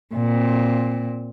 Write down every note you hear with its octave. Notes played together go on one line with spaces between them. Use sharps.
A#2 C4